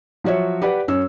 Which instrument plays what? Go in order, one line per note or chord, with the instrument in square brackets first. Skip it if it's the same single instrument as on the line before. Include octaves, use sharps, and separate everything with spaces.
[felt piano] F3 F#3 F#4 C#5 E5
G4 B4 D5 F#5
F#2 C#4 E6